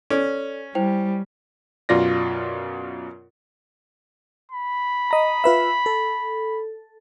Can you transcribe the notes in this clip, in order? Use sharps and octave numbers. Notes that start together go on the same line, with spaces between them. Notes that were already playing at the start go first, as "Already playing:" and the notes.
C#4 A4 D5
G3 E4 C5 G5
F#2 B2 F4 D5 A#6
B5
D#5 A#5
F4 B4 E5
A4